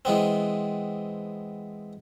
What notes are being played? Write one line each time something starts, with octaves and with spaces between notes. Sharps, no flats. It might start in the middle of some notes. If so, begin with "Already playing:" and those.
E3 G#3 B3 C4